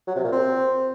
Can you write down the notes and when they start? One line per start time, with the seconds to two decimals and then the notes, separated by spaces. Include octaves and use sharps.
0.07 F#3
0.16 C3
0.24 A#2
0.32 C4